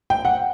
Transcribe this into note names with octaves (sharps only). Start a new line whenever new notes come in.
G5
F#5